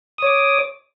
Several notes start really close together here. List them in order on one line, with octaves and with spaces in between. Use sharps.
D#6 C#5 D6